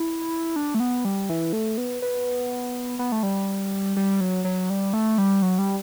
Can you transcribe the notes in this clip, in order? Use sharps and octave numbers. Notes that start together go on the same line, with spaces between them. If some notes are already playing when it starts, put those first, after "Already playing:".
Already playing: E4
D4
A3
B3
G3
E3
A3
B3
B3
B3
A3
G3
G3
F#3
F#3
G3
A3
G3
F#3
G3